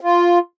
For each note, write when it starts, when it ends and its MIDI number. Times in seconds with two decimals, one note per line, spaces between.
0.01 0.39 65